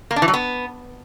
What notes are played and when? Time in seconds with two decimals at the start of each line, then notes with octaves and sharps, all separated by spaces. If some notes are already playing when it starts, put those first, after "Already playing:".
0.11 A#3
0.16 D4
0.22 E3
0.28 F#3
0.33 B3